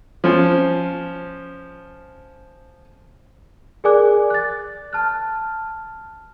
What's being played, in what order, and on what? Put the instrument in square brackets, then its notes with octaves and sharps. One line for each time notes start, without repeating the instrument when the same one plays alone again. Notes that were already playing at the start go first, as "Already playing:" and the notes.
[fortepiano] F3 C#4
[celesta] G#4 A#4 D5 G#5 D6 F#6
F#6 A6
A5 F6 F#6